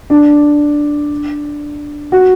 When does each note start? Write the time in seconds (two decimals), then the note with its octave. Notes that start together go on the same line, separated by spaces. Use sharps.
0.10 D4
2.12 F#4